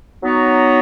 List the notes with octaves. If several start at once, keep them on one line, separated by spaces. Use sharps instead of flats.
F#3 B3 D#4 F#4 C#5